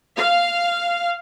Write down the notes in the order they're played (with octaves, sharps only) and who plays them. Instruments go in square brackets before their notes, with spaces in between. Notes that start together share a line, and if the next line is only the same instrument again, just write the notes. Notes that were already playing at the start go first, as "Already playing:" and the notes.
[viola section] F5